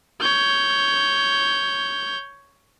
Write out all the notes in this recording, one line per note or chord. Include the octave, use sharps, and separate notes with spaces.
C#5 G6